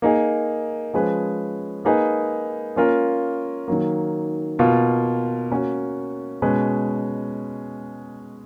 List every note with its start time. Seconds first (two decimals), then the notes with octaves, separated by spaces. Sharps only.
0.02 A#3 D#4 G#4
0.93 F3 G#3 C#4 G#4 B4
1.85 A#3 D#4 G#4 B4
2.76 A#3 C#4 F4 A#4
3.68 D#3 F#3 A#3
4.59 B2 A#3 F4
5.50 A#3 C#4 F#4
6.42 B2 G#3 C#4 G#4 B4